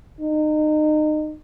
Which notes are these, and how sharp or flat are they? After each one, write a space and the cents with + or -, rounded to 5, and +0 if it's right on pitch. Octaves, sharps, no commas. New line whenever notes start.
D#4 -30